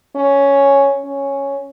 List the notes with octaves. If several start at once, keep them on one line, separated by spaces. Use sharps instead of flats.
C#4
C#4